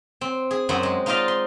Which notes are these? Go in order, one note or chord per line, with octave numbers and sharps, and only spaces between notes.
C4
G#4
F#2 C4 C5 F#5
G#3
D#4 F4 C5 D5 D#5 F5
C6